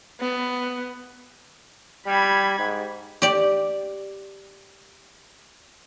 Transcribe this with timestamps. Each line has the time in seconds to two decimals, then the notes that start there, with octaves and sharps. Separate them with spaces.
0.21 B3
2.06 G3 B5 G#6
2.59 G#2
3.22 G4 D5